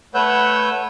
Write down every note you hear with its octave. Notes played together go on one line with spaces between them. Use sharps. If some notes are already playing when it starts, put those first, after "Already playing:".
A3 B4 C#5 F#5 E6 G6